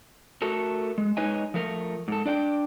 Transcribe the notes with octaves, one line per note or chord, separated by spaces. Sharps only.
A3 F#4 A4 A#4
G#3
G#3 D#4 B4 C#5 D#5 G#5
F3 A3 A#4
G#2 A4
D4 D5 F#5 G5